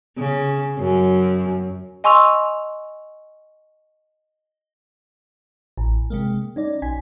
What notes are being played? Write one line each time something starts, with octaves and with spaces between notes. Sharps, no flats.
C#3
F#2
D#5 G#5 C6 C#6 E6 F7
A1
C3 G#3 A#3
C#4 D#4 D5
B1 G#5 G#6 B6